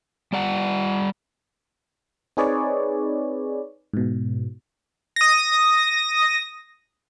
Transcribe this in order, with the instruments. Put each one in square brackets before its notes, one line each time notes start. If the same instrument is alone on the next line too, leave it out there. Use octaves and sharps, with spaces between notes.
[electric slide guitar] G3 D5 F#5
[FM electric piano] C4 D#4 G#4 B4 C#5 D5
G#2 B2
[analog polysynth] D#6 A#6